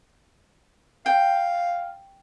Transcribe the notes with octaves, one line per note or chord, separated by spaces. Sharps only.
F5 G5